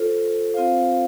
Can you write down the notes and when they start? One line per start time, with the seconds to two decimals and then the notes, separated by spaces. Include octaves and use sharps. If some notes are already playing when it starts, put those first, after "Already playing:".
Already playing: F4 A4 C5
0.54 C4 F4 C5 F5